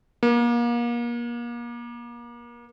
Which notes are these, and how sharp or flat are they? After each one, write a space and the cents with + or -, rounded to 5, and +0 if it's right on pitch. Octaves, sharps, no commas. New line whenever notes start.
A#3 +35